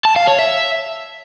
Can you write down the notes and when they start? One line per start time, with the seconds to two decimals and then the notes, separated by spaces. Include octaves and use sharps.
0.05 A5
0.16 F5
0.27 C#5
0.39 E5